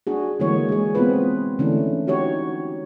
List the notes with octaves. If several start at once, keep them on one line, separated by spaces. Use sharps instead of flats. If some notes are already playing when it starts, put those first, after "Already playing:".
D4 F#4 G#4
D3 E3 G#3 A#3 C#5
G#3 G#4
B3 C4 F4 B4
D3 E3 A3 C#4 D4
D#4 F#4 G4 C#5